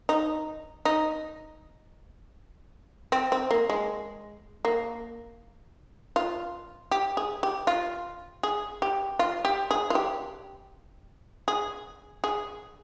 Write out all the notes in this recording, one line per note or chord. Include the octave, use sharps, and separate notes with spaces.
D#4
D#4
C4
C4
A#3
G#3
A#3
F4
G4
G#4
G4
F4
G#4
G4
F4
G4
G#4
F4
G4
G#4
G#4